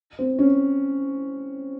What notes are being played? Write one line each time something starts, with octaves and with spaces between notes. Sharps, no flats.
C4
C#4